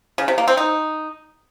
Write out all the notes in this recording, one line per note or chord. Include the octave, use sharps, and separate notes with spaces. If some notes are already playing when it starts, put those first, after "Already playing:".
C#3
C3
A#3
C4
D#4